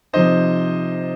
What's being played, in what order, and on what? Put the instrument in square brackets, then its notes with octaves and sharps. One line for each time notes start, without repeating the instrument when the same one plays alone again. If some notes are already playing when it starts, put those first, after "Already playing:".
[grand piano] C3 F3 C4 D#4 C5 D#5